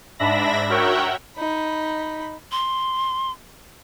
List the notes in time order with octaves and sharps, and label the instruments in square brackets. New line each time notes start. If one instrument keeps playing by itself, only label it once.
[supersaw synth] G#2 D4 E5 B5 A#6
F#4 A#4 C#5 E5 F#5 G5
[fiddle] D#4 B5
[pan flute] C6